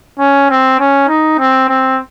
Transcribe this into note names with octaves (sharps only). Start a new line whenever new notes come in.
C#4
C4
C#4
D#4
C4
C4